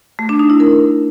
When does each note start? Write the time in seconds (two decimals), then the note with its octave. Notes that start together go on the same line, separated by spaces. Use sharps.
0.19 A3
0.29 D4
0.39 D#4
0.50 E4
0.60 A#4